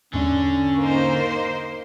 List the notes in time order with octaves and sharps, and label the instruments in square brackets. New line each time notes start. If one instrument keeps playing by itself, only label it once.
[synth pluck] E2 G#2 D5 [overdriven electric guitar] D3 [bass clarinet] C#4
[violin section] A#3 D#4 C5